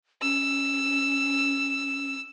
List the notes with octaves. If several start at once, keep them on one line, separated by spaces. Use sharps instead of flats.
C#4 E6